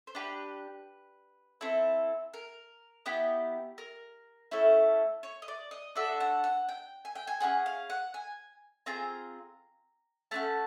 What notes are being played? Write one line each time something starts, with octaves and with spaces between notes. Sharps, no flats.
C5
D4 G4 B4
C4 E4 A4
A#4
B3 E4 G4
A#4
A3 C#4 E4 A4
C#5
D#5
D5
D#5
D4 F#4 A4 E5
F#5
F#5
G5
G#5
G5
G#5
C#4 E4 G#4 F#5
F5
F#5
G#5
C4 F4 G#4 A#5
A3 C#4 F#4 A5